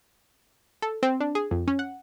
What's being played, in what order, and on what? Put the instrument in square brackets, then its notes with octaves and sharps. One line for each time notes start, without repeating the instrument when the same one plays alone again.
[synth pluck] A4
C4
D4
G#4
F2
C#4
F#5